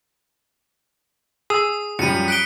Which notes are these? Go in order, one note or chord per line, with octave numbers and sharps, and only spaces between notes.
G#4 D#6 E6
F#2 F3 G3 C#7 D#7
F#6 B6 D7 G7